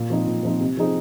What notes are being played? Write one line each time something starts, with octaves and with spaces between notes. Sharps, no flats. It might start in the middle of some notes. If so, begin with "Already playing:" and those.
Already playing: A#2
F3 C4 D#4
A#2
F3 C4 D#4
C3
F3 C4 D#4 G#4